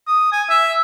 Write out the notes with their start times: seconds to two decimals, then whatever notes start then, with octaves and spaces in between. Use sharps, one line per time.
0.07 D#6
0.32 G#5
0.49 E5